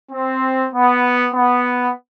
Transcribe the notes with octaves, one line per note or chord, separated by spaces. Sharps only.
C4
B3
B3